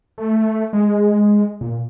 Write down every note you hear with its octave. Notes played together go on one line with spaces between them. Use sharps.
A3
G#3
A#2